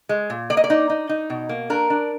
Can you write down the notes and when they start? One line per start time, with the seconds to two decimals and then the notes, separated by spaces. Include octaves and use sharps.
0.09 G#3
0.30 A#2
0.50 A#3 D5
0.57 D#5
0.64 D5
0.70 D#4
0.90 D#4
1.09 D#4
1.30 B2
1.49 A#3
1.70 D4 A#4
1.90 D4